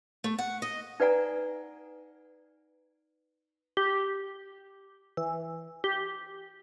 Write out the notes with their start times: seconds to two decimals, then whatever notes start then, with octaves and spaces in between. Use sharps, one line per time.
0.24 A3
0.38 F#5
0.62 D#5
1.00 D#4 B4 D5 F#5 G#5 A#5
3.77 G4
5.17 E3
5.84 G4